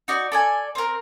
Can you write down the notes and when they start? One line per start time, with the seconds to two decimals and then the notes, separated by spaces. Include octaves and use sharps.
0.08 D#4 F#4 D5
0.32 A4 D5 G#5
0.75 C4 A#4